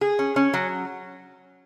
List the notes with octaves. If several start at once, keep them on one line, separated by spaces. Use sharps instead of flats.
G#4
C#4
C#4
F#3